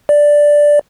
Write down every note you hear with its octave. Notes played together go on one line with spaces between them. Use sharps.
D5